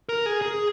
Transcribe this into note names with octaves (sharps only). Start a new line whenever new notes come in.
A#4
G#4
G#4